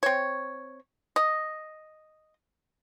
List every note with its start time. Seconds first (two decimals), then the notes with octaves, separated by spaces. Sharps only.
0.03 C4 C#5
1.16 D#5